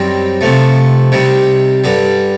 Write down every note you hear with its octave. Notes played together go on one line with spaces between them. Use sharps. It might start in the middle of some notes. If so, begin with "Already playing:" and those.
Already playing: F#2 D#3 G3 C4
C3 F3 A3
C3 D#3 G3
G2 D3 G3